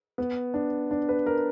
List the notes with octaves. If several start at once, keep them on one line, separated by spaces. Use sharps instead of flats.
B3
D4
D4
B4
A#4